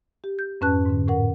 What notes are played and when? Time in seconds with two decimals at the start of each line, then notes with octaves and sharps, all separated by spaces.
0.24 G4
0.39 G6
0.61 F2 G#2 C#4 B4 A5 F#6
0.86 G#2 D3
1.08 A2 A#4 F#5